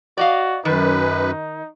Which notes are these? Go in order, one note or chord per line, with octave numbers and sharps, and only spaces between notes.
F#4 D5 D#5 F5
F#2 D#3 D#4 B4